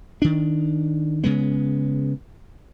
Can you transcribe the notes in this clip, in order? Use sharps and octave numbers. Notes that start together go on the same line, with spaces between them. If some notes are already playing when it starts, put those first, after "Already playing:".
D#3 D4
C#3 G#3 B3